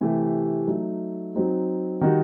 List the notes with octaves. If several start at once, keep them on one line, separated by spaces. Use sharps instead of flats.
C3 E3 A3 E4 G4
F#3 A3 D#4
F#3 C4 D#4 F#4
D#3 G3 D#4 F#4